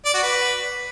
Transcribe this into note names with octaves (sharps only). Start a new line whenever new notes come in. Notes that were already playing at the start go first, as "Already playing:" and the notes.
D5
F#4
B4